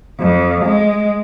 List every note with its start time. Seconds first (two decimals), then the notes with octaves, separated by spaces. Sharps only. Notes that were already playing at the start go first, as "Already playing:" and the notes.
0.20 F2
0.64 G#3